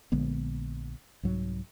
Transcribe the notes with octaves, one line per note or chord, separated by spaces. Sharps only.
A#1 D3 G#3 B3
C2 G#2 F#3